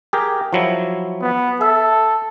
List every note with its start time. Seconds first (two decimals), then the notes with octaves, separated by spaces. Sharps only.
0.13 G4 G#4 A#4
0.53 F3 F#3 E4
1.21 B3
1.61 A4 E5